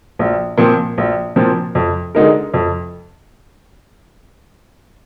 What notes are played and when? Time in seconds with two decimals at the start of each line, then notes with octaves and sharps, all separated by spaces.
0.19 A#1
0.57 A#2 F3 C4
0.98 A#1
1.36 A#2 F3 C4
1.75 F2
2.15 D3 G#3 D#4 A#4
2.54 F2